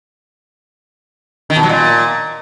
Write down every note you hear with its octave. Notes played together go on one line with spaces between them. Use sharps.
D#3
B2
F#3
A#2